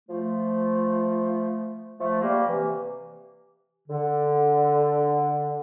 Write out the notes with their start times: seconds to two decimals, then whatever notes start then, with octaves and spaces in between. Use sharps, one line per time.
0.09 F3 A3
1.99 F3 A3
2.22 G3 A#3
2.46 C3 E3
3.89 D3